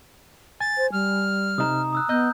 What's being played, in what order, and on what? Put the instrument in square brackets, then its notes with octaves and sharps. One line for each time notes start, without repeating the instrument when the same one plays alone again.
[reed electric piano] G#5 [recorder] A6
[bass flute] C5
[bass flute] G3 [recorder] F6
[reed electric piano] C3 D#4 [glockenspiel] A#5 D#6
[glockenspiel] D#6 E6 F#6
[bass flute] B3 [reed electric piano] D#5 [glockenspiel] F#6 G6